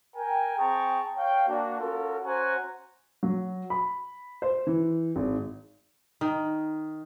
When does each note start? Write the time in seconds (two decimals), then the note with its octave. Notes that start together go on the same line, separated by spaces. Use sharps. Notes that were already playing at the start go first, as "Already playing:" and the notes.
0.16 A#4 G5 G#5
0.58 C4 G#4 G5 A5 A#5 C#6
1.17 C#5 F5 G5
1.48 A#3 D4 F#4
1.80 C#4 F4 F#4 A4 A#4
2.24 C#4 F#4 C5 F#5 G#5 A#5
3.23 F#3
3.70 B5
4.42 C5
4.67 E3
5.16 G#1
6.21 D#3